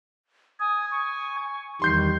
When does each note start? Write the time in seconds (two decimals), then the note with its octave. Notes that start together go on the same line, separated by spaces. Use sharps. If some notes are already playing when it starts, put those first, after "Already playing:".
0.60 G#5 D#6
0.92 C#6
1.82 E2 D#3 G3 C6 G6 C7